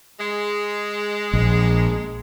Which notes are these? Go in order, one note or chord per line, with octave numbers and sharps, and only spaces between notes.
G#3
A#1